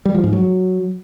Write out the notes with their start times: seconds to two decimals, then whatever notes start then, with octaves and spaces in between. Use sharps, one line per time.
0.05 G3
0.15 F3
0.24 G#2
0.33 F#3